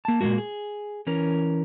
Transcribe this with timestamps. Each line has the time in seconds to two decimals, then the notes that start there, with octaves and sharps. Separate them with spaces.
0.05 A#3 A5
0.21 A#2 D#3 G#3 A#3 F#4
0.38 G#4
1.07 E3 C#4 A#4